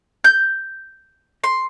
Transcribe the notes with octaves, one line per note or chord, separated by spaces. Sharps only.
G6
C6